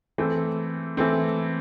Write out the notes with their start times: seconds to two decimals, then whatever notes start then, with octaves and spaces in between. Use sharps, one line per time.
0.18 E3 A3 C4
0.97 E3 A3 C4